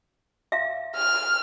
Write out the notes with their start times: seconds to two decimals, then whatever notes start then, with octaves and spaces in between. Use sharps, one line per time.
0.52 E5 F5
0.96 F6